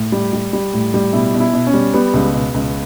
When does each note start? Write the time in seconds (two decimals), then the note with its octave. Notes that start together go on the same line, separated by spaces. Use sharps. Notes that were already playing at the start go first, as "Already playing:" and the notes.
Already playing: A2
0.12 G3
0.33 G3
0.53 G3
0.73 A2
0.94 G3
1.13 B2 E4
1.33 B2
1.40 E4
1.53 B2
1.67 C#4
1.74 G3
1.93 G3 B3
2.14 C#2
2.34 B2
2.54 C#2